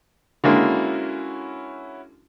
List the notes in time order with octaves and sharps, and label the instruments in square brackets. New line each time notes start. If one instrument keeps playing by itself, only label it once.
[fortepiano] D3 G#3 A#3 [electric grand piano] C#4 E4 F#4